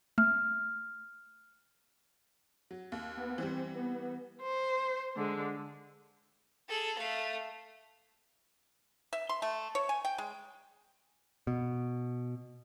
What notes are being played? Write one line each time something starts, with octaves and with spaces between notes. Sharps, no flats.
A3 F6
F#3
D#2
B3
E3 G3 C4
B3
C5
D3 G#3
G#4 A4
A3 F5
E5
C6
A3
C#5
G#5
G5
G#3
B2